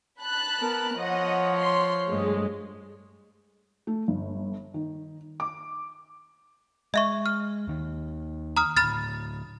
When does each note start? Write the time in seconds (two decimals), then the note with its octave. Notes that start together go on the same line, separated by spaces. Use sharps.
0.22 A5 B5 F#6
0.60 B3 A#4
0.96 F3 C#5 D#5 F#5
1.58 C6
2.07 G2 G#3 A3
3.87 A3
4.08 G1
4.74 D#3
5.40 D6
6.94 G#3 D#5 E5 C#6
7.26 F6
7.68 D#2 D#3
8.57 A#5 D#6 F6
8.77 D1 B5 F6 A6